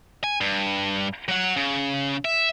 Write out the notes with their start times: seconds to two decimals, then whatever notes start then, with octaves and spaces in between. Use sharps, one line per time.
0.24 G#5
0.41 G2
1.28 F#3 F#5
1.56 C#3
2.25 E5